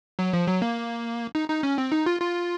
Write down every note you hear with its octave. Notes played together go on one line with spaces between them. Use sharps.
F#3
F3
F#3
A#3
D#4
D#4
C#4
C4
D#4
F4
F4